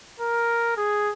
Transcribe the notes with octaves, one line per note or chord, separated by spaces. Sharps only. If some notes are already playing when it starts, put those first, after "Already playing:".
A#4
G#4